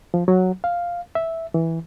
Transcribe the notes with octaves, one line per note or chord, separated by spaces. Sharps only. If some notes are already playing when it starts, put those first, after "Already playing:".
F3
F#3
F5
E5
E3